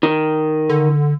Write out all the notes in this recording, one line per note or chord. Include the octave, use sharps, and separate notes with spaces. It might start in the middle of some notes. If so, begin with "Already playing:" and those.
D#3
D3